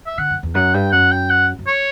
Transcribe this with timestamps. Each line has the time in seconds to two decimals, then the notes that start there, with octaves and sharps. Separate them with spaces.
0.06 E5
0.18 D3 F#5
0.31 F#2
0.43 E2
0.55 F#2 F#5
0.74 G2 G5
0.92 F#2 F#5
1.11 G5
1.30 F#5
1.59 F#2
1.67 C#5